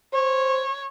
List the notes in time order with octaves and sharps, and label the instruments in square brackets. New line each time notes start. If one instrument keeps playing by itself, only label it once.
[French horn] C5 [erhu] C#5